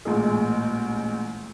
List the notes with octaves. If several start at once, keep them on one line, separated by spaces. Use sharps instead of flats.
A1 A#2 G#3 G#4